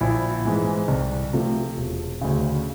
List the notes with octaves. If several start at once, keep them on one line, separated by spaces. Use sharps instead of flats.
A#1 E4
G#2 E3 G#3
C2
C3 F3 A3
E1
D2 C#3